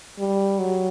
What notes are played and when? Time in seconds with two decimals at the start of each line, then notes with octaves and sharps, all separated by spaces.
0.19 G3
0.59 F#3